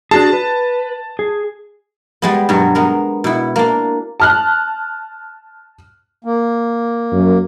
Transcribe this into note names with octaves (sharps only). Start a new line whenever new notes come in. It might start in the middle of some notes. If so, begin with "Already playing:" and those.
D4 F#4 G#4 A5
B4
G#4
G3 G#3 B3
G2 B2 F#3
G#3 B3 A#4
B2 E4
A#3 D4
A5 F6 F#6
A#3
F#2